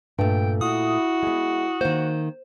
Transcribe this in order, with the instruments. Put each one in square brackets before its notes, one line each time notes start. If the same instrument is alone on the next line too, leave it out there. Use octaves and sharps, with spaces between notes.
[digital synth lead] G2 [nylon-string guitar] A#2 A3 [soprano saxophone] G5
[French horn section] E4 [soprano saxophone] F#4 [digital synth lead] D#6
[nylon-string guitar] G#3 B3
[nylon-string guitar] D#3 A#3 [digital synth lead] C5